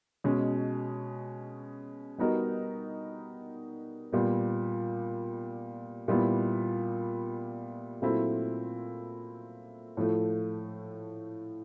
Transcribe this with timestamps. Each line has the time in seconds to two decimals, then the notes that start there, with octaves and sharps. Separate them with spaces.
0.24 B2 G#3 C#4
2.18 G3 B3 D#4 F#4 A#4
4.12 A#2 G3 B3
6.08 A#2 G3 B3 E4
8.02 A#2 F#3 A3 C4 E4
9.97 A2 F3 A3